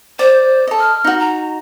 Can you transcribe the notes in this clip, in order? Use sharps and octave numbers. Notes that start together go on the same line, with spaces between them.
C5 D5
A4 D#5
F6
D#4 F#4
A#5